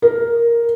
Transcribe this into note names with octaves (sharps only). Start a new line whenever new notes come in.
A#4